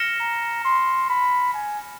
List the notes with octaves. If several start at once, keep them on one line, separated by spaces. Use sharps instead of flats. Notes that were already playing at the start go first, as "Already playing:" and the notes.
Already playing: F6 A#6 C#7 E7 G7
A#5
C6
B5
G#5